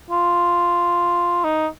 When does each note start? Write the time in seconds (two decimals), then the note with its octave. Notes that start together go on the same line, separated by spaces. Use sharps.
0.11 F4
1.44 D#4